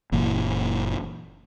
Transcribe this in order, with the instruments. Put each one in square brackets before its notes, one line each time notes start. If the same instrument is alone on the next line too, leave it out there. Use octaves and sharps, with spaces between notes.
[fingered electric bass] F#1 A#2 E3